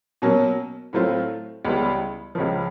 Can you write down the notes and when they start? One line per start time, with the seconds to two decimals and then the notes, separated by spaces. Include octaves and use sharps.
0.22 B2 F#3 A#3 C#4
0.93 A2 F#3 A3 C4 F4
1.65 C#2 C#3 E3 G3 B3
2.35 C#2 C#3 F3